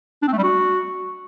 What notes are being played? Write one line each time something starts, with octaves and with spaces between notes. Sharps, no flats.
D4
C4
A3
G3
F#4